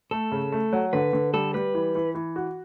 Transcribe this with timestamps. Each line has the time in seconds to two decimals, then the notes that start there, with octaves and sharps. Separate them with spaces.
0.11 A3 A4
0.32 C#3
0.52 A3
0.73 F#3
0.93 D3 B4
1.13 D3
1.33 G3 A4
1.54 G3 B4
1.74 E3
1.95 E3
2.15 E3
2.36 F#4